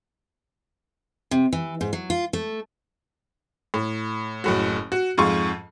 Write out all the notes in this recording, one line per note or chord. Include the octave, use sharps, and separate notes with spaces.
C3
E3
G#2
F#3
F4
A3
A2
F#1 A2 F#4
F#4
F2 G#2 F4 C#6